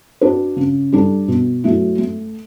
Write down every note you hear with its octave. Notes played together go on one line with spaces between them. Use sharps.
D4 F#4 B4
C#3
G3 D4 A4
B2
F#3 A3 E4
A3